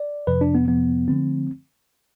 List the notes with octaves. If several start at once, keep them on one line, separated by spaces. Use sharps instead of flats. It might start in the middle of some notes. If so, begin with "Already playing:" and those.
Already playing: D5
F2 C3 F3 B4
D4
B3
F2 C3 F3 B3
D3 F3 A3 C4